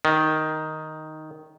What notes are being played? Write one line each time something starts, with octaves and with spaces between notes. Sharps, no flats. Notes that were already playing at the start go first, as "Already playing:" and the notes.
D#3